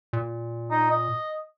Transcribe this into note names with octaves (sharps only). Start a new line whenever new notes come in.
A#2
D#4
D#5